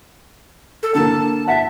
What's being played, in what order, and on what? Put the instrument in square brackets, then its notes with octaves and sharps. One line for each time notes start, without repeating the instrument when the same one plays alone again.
[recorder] A4
[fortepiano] D3 A#3 [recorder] A5
[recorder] E5 [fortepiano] F#5 A5